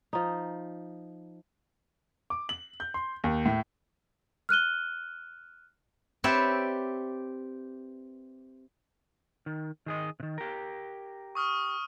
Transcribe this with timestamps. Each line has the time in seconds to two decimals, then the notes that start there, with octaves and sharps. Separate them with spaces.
0.13 F3 D#4
2.30 D6
2.49 F#7
2.80 G6
2.94 C6
3.24 D#2
3.46 A2
4.49 F6 F#6 D#7 G7
6.24 C4 G4 B4 C#5 D5 E5
9.46 D#3
9.86 D#3 G#4 D#5
10.20 C3 D#3
10.38 G4 A#4
11.35 C#6 D#6 F6